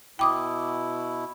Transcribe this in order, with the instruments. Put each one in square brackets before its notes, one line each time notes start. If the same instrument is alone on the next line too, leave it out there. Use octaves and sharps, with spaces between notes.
[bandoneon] B2 E4 [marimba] G5 D6 D#6